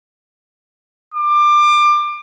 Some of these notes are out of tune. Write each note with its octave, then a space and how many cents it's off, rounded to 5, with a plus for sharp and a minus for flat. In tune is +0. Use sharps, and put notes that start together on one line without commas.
D6 +25